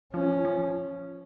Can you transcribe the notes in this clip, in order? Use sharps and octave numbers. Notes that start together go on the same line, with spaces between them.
F3 C#4
F3